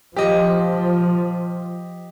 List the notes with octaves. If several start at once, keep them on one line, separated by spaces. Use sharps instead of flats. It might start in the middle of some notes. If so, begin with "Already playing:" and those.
F3 G4 D#5